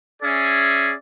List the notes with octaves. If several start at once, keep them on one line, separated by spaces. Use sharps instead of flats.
C#4 G#4 D5 E5